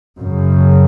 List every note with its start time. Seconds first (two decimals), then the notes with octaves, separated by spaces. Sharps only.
0.18 F#2 C#3